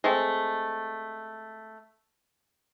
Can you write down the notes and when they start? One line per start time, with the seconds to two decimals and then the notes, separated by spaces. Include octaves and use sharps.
0.04 G#3 A3 C4